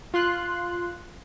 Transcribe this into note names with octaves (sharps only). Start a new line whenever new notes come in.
F4 C6 F#6